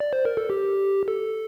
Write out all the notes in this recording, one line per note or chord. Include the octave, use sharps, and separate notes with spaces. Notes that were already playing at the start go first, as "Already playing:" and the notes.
D5
C5
A#4
A4
G4
A4